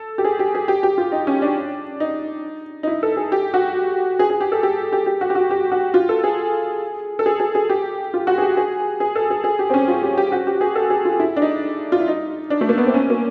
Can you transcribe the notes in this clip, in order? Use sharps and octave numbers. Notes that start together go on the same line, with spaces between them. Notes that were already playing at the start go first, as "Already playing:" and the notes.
Already playing: A4
G4
G#4
G4
G#4
G4
G4
F4
D#4
C#4
D4
D#4
D#4
E4
A4
G#4
G4
F#4
G#4
G#4
G4
A4
G4
G4
G4
F#4
G4
F#4
G4
F#4
F4
A4
G#4
A4
G#4
G#4
G#4
G4
F4
F#4
G#4
G4
G#4
G#4
A4
G#4
G#4
G4
C4
C#4
F4
G4
G4
F#4
G4
G#4
A4
G#4
F4
E4
D4
D#4
F4
E4
D#4
D4
A3
A#3
B3
C4
C#4
A#3